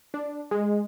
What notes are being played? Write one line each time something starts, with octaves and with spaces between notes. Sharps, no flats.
D4
G#3